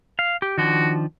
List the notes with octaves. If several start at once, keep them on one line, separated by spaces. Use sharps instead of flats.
F5
G4
D#3 F3 D4 F#4